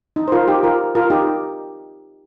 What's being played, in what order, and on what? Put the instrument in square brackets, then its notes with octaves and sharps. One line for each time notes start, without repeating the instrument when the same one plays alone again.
[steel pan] D#4
C5
F4 A#4
D#4 G4
F4 A#4
F4 A#4
D#4 G4